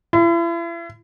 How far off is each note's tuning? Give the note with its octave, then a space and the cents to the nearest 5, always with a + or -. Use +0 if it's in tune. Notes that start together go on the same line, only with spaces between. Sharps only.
E4 +40